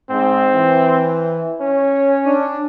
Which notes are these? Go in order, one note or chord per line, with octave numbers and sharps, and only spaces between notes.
G#2 C4
E3
C#4 C#5
D4